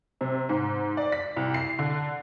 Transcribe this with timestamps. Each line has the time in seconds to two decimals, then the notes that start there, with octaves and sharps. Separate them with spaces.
0.21 C3
0.49 G#2
0.97 D5
1.12 B6
1.36 C2
1.54 C7
1.79 D3